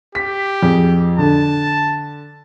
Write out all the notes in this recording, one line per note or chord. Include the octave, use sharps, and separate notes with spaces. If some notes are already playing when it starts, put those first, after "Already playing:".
G4 B6
F2 G#4
D3 A5